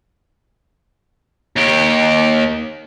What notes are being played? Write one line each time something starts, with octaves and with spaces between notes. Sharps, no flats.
D#2 G4